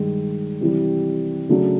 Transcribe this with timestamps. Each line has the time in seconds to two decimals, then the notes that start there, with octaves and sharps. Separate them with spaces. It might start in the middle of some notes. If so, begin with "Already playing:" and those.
Already playing: G2 D#3 G#3
0.61 C3 E3 G3
1.49 C#3 F#3 A3 D4 F#4